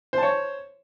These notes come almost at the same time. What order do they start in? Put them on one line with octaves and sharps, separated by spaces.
C5 A5 C#5